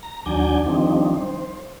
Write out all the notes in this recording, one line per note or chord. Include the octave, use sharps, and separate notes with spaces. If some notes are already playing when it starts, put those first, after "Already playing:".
A#5
D#2 F#3 D4 D5 G#5 G6
D#3 F3 G3 C4 D4 D#4
C5